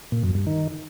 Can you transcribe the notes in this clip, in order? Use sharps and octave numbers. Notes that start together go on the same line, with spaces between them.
A#2
F#2
G2
D#3